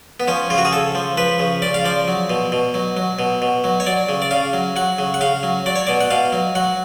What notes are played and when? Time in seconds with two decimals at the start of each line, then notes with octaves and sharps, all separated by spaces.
0.20 B3
0.28 F3 C#4
0.50 C#3 F4
0.58 F#4
0.65 G#4
0.73 C#3 A4
0.95 F3
1.17 F3 B4
1.39 C#3
1.62 C#3 D5
1.74 F5
1.85 F3 D5
2.08 F#3
2.30 B2
2.52 B2
2.74 F#3
2.97 F#3
3.19 B2
3.42 B2
3.64 F#3
3.80 C#5
3.86 F#3 D5
4.09 C#3
4.22 D5
4.31 C#3 F5
4.53 F#3
4.76 F#3 F#5
4.99 C#3
5.14 F#5
5.21 C#3 F5
5.43 F#3
5.66 F#3 D5
5.76 C#5
5.87 B2 D5
6.01 F#5
6.11 B2 F5
6.32 F#3
6.55 F#3 F#5